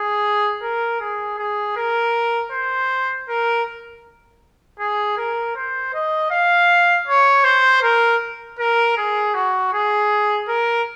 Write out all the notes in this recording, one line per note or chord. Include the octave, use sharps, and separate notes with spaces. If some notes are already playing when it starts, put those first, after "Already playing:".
Already playing: G#4
A#4
G#4
G#4
A#4
C5
A#4
G#4
A#4
C5
D#5
F5
C#5
C5
A#4
A#4
G#4
F#4
G#4
A#4